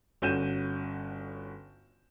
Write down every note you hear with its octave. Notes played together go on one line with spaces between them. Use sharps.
G1 C#4 F#4 G6 D#7 E7